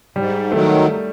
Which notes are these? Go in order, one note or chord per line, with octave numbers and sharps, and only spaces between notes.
G#2 G3
D#3 F#3 A3